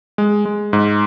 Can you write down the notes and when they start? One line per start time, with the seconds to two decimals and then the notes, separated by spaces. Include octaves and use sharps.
0.18 G#3
0.45 G#3
0.73 G#2